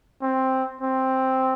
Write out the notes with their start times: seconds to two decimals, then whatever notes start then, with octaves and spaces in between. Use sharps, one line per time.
0.22 C4
0.81 C4